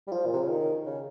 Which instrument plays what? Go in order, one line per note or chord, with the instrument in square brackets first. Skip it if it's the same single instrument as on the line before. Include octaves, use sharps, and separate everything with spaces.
[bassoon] G3
[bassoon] F3 [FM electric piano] F4
[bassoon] A#2
C3
C#3
D#3
C#3